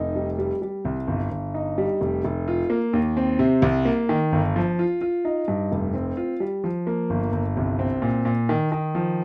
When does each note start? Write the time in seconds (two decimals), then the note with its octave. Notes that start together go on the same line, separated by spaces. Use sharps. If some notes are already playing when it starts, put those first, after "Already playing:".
Already playing: F1 D#4
0.16 G3
0.38 G3
0.62 G3
0.85 C2
1.08 G1
1.31 G1
1.54 D#4
1.78 G3
2.01 F1
2.24 F1
2.48 F4
2.70 A#3
2.93 D#2
3.17 C4
3.39 C3
3.62 C2
3.85 A#3
4.09 D#3
4.32 G1
4.56 F3
4.79 F4
5.01 F4
5.25 D#4
5.48 G2
5.72 F1
5.94 C4
6.17 F4
6.40 G3
6.64 F3
6.87 A#3
7.10 G1
7.32 G1
7.57 C2
7.79 C4
8.02 A#2
8.25 A#2
8.49 D#3
8.72 D#3
8.95 F3